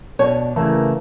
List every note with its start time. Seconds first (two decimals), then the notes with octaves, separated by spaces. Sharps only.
0.19 B2 D4 C#5
0.56 C#3 E3 A3 A#3